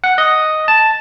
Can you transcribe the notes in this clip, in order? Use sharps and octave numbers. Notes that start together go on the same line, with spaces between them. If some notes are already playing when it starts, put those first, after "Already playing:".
F#5
D#5
A5